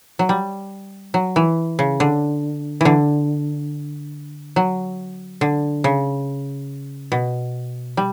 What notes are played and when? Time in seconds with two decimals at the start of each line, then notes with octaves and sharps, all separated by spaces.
0.19 F#3
0.29 G3
1.14 F#3
1.36 E3
1.79 C#3
2.00 D3
2.81 D3 E3
4.56 F#3
5.41 D3
5.84 C#3
7.12 B2
7.97 G3